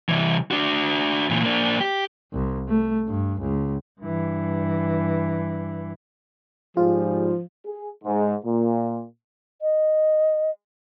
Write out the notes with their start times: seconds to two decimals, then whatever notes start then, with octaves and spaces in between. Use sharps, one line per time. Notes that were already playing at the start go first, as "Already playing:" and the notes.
0.09 C2 E3
0.51 D4 F#4
1.30 A#2 E3
1.44 A#3 D4
1.81 G4
2.33 C2
2.68 A3
3.08 G2
3.41 C#2
4.01 G2 E3
6.77 G#2 F3 G3 F4 G#4
7.66 G#4
8.04 G#2
8.44 A#2
9.62 D#5